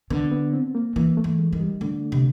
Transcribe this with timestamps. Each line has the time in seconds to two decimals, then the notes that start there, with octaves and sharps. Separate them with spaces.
0.10 D3 B3
0.31 B3
0.53 C4
0.75 A#3
0.96 E3 A#3
1.17 A3
1.24 E3
1.39 G#3
1.53 D#3
1.60 G3
1.81 D3 A3
2.12 C3